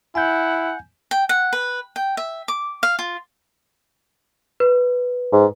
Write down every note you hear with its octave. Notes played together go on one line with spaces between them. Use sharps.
E4 F#5 G#5 G6
G5
F#5
B4
G5
E5
D6
F5
F4
B4
G#2